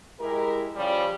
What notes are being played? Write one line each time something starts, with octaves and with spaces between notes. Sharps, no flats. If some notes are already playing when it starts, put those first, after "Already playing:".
G#3 E4 G4 A#4
C#3 F3 G3